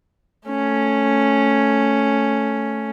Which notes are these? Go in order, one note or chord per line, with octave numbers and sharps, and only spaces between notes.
A3 C#4